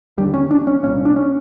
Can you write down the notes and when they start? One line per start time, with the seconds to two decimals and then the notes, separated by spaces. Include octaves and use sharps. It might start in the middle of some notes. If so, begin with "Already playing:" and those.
0.18 D#2 D3 G3
0.34 C#4
0.51 D4
0.67 C#4
0.83 C2 A#2 C#4
1.05 D4
1.16 C#4